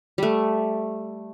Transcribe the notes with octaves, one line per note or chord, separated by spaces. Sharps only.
G3 A3